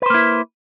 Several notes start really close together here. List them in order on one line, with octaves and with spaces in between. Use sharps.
B4 C5 A#3 E4